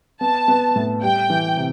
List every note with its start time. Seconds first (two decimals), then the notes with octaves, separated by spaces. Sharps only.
0.21 B3 A5
0.48 B3
0.76 A2
1.02 G3 G5
1.30 E3
1.57 C3